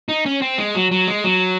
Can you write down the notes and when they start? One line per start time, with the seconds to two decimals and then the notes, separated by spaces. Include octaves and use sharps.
0.09 D#4
0.26 C#4
0.42 C4
0.58 G#3
0.75 F#3
0.91 F#3
1.07 G#3
1.24 F#3